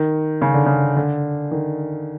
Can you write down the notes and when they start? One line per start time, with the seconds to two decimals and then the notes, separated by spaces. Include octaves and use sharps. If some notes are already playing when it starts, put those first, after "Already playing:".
Already playing: D#3
0.42 C#3
0.54 D3
0.66 C#3
0.96 D3
1.51 D#3